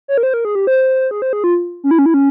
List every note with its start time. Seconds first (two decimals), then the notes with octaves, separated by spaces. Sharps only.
0.08 C#5
0.18 A#4
0.23 C5
0.34 A#4
0.45 G#4
0.55 G4
0.67 C5
1.11 G#4
1.22 C5
1.33 G#4
1.44 F4
1.84 C#4
1.91 E4
1.99 C#4
2.06 E4
2.14 C#4